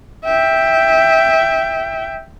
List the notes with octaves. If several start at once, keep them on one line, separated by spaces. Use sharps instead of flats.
E5 G5